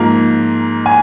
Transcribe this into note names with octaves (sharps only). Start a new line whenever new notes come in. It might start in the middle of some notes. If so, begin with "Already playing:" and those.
Already playing: G#2 F3 A#3 A#5
G#5